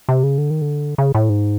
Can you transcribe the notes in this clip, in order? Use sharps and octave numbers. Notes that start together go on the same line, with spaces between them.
C3
C#3
D3
D#3
D3
C#3
A2
G#2